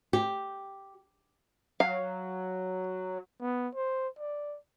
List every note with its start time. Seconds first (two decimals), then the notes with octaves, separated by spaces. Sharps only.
0.13 G4
1.80 F#3 F5
3.41 B3
3.75 C5
4.18 D5